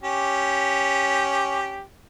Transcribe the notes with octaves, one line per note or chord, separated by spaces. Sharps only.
C#4 G4